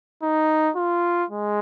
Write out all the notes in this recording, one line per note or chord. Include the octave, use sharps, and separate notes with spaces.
D#4
F4
G#3